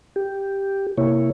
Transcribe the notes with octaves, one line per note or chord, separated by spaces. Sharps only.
G4
C3 A#3 E4 C#5